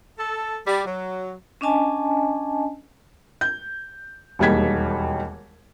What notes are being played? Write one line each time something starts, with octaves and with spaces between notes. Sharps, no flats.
A4
G3
F#3
C#4 D4 D#5 G#5 A5
G6
E1 D#2 G3 D#4 G#6 B6